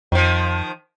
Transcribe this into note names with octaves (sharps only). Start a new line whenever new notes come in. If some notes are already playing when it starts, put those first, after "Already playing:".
F2 D#3 F3